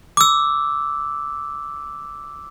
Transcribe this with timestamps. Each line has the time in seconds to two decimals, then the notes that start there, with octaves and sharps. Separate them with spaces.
0.17 D6 E6